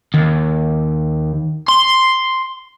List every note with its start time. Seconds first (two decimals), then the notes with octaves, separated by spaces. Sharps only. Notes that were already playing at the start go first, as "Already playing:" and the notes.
0.14 D#2
1.68 C6